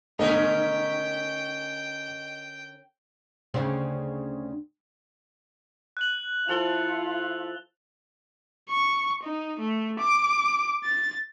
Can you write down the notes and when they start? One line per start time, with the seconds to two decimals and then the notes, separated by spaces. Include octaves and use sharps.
0.19 G#2 B2 D3 A3 C#4 A#4 D#5 G5
3.54 D2 C#3 C4
5.97 F#6 F#7
6.48 F3 E4 F4 A4 F7 G7
8.70 C#6
9.23 D#4
9.60 A3
9.99 D6
10.84 A6